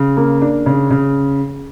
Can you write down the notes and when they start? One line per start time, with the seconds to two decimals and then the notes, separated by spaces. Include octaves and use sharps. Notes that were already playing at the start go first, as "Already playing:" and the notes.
Already playing: C#3
0.17 A#3
0.41 D4
0.66 C#3
0.90 C#3